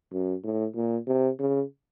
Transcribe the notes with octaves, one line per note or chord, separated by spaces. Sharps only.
F#2
A2
A#2
C3
C#3